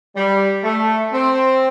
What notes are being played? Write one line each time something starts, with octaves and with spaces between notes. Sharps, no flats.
G3
A3
C4